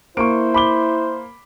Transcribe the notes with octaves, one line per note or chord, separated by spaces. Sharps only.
A#3 E4 C5 C#6 D7
B5 D6 G7